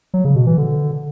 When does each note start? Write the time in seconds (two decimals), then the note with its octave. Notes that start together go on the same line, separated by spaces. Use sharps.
0.14 F#3
0.25 C#3
0.36 B2
0.47 E3
0.58 D3